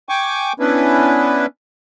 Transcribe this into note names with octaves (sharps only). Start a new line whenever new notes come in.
G5 G#5 C#6 D6
B3 C#4 D4 E4 B4